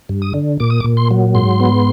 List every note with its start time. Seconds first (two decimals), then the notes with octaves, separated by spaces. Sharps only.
0.09 G2
0.22 D#6
0.34 D3
0.60 A#2 D6
0.70 D#6
0.80 D6
0.84 A#2
0.97 C6
1.11 F#3
1.35 G#2 C6
1.60 B3